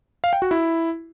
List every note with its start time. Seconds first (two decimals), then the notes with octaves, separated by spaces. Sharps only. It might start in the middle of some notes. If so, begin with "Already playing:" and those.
0.24 F5
0.33 G5
0.42 F#4
0.51 E4